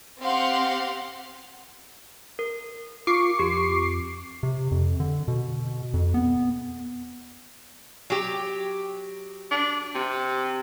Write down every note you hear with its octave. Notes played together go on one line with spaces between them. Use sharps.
C4 G4 F5 F#5 C6
A#4
F4 C#6 D6 C7
F2 G4
C3
F2
D3
B2
F2
B3
F#3 G4
D4
C3